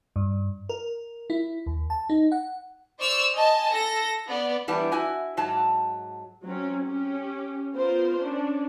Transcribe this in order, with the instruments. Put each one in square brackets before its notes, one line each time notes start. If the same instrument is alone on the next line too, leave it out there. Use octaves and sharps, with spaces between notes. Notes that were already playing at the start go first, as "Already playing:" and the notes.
[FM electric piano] G2
A#4
E4
D#2
A5
D#4
F#5
[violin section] C5 D5 C#6 E6 F6
D#5 G#5 A5
A4 A#6
B3 D5
[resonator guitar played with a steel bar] E3 G3 B3 D4 E4
E4 F#4 G#5
G#2 F#3 A5
[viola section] F#3 C4 C#4
C#4 G4
B3 F4 A#4 C5
C#4 D4